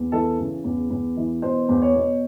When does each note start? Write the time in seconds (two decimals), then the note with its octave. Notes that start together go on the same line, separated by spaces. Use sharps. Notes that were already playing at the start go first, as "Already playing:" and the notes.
Already playing: E2
0.12 E3 A4
0.39 C#3
0.64 E2
0.90 E2
1.17 E3
1.42 B2 C5
1.69 E2
1.82 C#5
1.95 B2